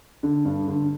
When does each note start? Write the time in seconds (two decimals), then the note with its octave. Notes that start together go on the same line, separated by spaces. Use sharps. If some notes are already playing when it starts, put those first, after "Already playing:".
0.23 D3
0.45 G2
0.68 D3